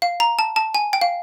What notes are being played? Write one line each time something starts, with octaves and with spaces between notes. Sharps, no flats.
F5
A#5
A5
A5
G#5
G5
F5